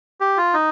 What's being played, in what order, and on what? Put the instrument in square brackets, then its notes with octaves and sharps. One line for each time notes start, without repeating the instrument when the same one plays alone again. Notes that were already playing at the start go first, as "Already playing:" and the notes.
[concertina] G4
F4
D#4